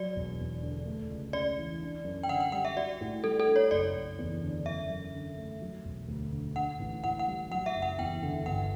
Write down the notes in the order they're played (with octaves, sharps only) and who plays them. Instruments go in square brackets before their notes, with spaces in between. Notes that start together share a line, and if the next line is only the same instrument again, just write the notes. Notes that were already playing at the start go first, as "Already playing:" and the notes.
Already playing: [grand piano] F#3 [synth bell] D5
[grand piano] E1
E2
D3
A3
C#2
[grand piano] C#3 [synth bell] D5
[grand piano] E3
D4
F#2
[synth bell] G5
[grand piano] D3 [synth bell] F#5
[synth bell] G5
[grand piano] G3 [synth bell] F#5
[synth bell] E5
[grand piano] F#4 [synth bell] D5
[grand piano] A2
[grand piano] G3 [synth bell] A4
[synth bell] A4
[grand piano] D4
[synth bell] C#5
[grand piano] F#1 [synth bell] D5
[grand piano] F#1
E2
D3
[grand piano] F#2 [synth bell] E5
[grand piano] F#2
D3
A3
F#3
E1
D2
D3
[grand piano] D4 [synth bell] F#5
[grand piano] A1
[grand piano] A2 [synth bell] F#5
[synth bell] F#5
[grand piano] G3
[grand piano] F#3 [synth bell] F#5
[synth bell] E5
[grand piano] F#1
[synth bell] F#5
[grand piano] E2 [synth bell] G5
[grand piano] D3
[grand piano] G1 [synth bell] F#5